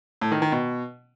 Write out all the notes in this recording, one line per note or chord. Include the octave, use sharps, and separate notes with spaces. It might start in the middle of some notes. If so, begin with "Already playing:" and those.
A2
D#3
D#3
B2